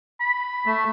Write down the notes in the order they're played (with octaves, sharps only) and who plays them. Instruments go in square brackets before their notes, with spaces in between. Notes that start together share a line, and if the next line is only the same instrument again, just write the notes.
[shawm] B5
[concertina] A3